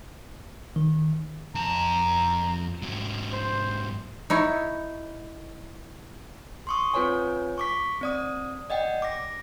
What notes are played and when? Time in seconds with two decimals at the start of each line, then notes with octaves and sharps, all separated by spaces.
0.76 D#3
1.55 F2 A5 A#5
2.82 G#2 F#3
3.33 C5
4.30 D#4 E4 C#5
6.67 C6 C#6 D#6
6.94 C4 F4 B4 C#5 G#5
7.58 C#6 D6 B6
8.01 C4 D5 D#6
8.70 D5 D#5 F#5 G5
9.02 D6 A#6